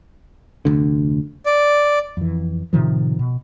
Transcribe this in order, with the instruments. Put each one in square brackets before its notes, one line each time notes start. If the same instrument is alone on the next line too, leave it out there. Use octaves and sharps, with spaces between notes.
[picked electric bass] F1 D2 D3
[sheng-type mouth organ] D5
[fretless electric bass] F2 E3
A2 C3 D#3 F3
B2